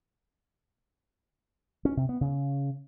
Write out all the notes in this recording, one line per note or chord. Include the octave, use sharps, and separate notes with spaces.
C#4
C3
B3
C#3